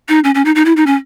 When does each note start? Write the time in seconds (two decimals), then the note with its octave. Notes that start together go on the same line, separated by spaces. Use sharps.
0.09 D#4
0.24 C#4
0.35 C#4
0.45 D#4
0.55 D#4
0.65 E4
0.77 D#4
0.87 C#4